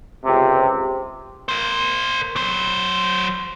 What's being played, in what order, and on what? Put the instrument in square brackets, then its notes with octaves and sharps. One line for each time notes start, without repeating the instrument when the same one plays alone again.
[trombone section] C#2 C3 C4
[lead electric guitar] A#4 C5
F#3 C5